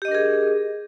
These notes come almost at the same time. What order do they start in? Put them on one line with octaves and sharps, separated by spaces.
G4 D#5 D4 A#4 G#4